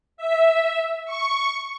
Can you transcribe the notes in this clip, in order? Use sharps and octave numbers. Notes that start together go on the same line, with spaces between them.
E5
C#6